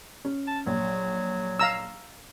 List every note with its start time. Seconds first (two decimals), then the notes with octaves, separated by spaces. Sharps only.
0.25 C#4
0.47 A5
0.66 A#1 F#3
1.59 F5 A#5 E6